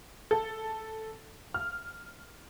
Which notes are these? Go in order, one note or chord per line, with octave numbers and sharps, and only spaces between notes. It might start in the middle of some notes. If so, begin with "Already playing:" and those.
A4
F6